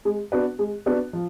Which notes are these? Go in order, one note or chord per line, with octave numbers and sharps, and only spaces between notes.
G#3
B3 D4 F#4 B4
G#3
B3 D4 F#4 B4
F3